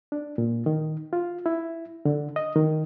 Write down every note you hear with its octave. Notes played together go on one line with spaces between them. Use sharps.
D4
A#2
D#3
F4
E4
D3
D#5
D#3